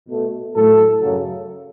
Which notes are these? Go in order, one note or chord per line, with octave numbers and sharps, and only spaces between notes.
B2 A3
A2 F#3 A3 A4
F#2 C#3 F#3